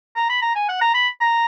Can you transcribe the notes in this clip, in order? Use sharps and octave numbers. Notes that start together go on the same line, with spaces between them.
A#5
B5
A#5
G#5
F#5
A#5
B5
A#5